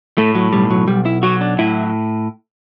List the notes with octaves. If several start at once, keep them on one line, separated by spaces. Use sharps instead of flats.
A2 A3
F#3
B1 G3
F#3
B1 G3
E4
F#3 F#4
D4
A2 E4